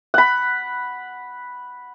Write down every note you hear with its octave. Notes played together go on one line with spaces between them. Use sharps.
F#5 B5